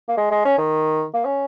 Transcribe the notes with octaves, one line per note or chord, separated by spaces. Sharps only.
A#3
G#3
G#3
C#4
D#3
A#3
C#4